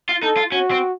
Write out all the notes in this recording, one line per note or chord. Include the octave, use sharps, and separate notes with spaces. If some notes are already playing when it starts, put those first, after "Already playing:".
F4
D#4 A4
F4
C#4 F#4
C4